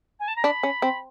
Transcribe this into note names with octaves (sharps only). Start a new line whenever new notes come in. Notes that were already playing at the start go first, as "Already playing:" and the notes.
G#5
A5
A#5
D4 B5
C#4
C4